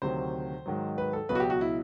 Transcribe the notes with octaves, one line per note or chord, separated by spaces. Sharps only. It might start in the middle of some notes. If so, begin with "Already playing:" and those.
D2 C3 D#3 F#3 C5
G#2 D#3 F#3
B4
A4
C#2 B2 F#3 B4
F#4
G4
F#4
E4